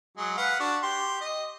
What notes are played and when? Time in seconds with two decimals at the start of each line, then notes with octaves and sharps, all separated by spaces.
0.17 F#3 G#3
0.37 B4 F5 F#5
0.59 D4 F#4
0.83 G4 C6
1.21 D#5